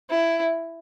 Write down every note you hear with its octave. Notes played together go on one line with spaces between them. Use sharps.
E4